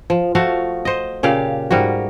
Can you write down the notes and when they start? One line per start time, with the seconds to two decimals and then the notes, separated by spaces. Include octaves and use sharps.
0.10 F3
0.35 F3 A3 F#4 F5
0.85 C5 D#5
1.23 A#2 C#3 G4 F5
1.71 G#2 G3 A#3 F#4